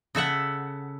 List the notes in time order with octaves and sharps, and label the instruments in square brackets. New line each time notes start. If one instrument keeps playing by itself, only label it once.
[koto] C#3 A4 E5 F#5